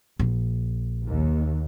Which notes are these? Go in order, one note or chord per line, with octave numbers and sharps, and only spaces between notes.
A#1
D#2